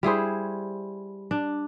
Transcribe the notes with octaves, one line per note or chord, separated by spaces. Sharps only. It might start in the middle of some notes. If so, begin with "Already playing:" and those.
G3 E4 G#4 C5
D4